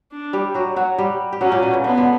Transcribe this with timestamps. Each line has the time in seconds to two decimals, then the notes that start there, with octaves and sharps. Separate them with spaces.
0.11 D4
0.33 G3 G4
0.54 F#3 F#4
0.76 F#3 F#4
0.98 G3 G4
1.33 G4
1.41 F#3 C#4 F#4
1.52 A#2 A#3
1.62 B2
1.74 C#3
1.84 D3 B3
1.98 D3